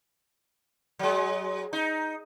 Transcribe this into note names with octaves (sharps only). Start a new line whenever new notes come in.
F#3 G#3
D#4